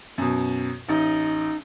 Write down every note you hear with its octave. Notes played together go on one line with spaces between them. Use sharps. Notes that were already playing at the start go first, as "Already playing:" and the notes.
F#2 B2
A1 D#4